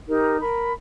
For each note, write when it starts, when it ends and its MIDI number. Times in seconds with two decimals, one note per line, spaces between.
0.08 0.40 63
0.08 0.40 67
0.08 0.40 70
0.40 0.73 70
0.40 0.73 83